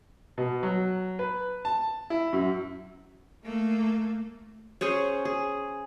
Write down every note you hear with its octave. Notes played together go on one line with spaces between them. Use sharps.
B2
F#3
B4
A5
E4
F#2
A3 A#3
C#4 G#4 C5 C#5
G#4